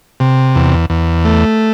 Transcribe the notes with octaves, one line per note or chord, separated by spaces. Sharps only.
C3
E2
E2
A3